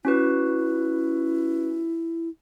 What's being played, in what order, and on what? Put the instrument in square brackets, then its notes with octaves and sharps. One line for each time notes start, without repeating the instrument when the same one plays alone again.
[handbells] C#4 F#4 B4 [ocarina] E4